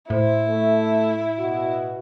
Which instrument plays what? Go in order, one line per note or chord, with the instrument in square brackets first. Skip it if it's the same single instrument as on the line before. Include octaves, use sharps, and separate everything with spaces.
[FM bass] A2 [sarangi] E4 [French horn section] C5
[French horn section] A3
B2 F#4